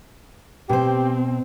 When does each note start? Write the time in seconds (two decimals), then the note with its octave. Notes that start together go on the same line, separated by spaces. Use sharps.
0.69 B2 C4 G4 C5